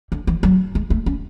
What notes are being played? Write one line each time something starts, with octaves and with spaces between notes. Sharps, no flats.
D3
E3
F#3
G#3
A3
C#4